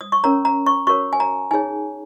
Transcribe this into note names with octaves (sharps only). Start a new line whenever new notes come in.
D#6
C#6
C#4 A#4 C#5 A#5
A#5
C#6
F#4 A#4 C#5 C#6
G#5
A#5
D#4 G#4 C#5 G#5